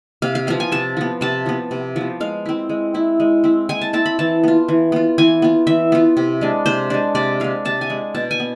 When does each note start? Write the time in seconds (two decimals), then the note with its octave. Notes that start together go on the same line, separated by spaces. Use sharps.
0.22 C3 F5
0.35 F5
0.47 F3 B3 F5
0.60 G#5
0.72 C3 A5
0.97 F3 B3
1.21 C3 A5
1.46 F3 B3
1.71 C3
1.96 F3 B3
2.20 G#3 F5
2.46 C4 E4
2.69 G#3
2.94 C4 E4
3.20 G#3
3.44 C4 E4
3.69 G#3 G#5
3.81 A5
3.93 C4 E4 A5
4.06 B5
4.19 E3 A5
4.44 B3 F4
4.68 E3
4.92 B3 F4
5.18 E3 G#5
5.42 B3 F4
5.67 E3 E5
5.92 B3 F4
6.17 C3
6.41 G#3 D4
6.66 C3 C5
6.90 G#3 D4
7.15 C3 D5
7.40 G#3 D4 F5
7.65 C3 A5
7.81 G#5
7.90 G#3 D4
8.15 B2 A5
8.31 G#5
8.40 B3